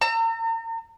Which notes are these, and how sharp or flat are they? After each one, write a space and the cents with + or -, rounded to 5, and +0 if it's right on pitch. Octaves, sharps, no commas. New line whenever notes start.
A#5 -40 E6 +20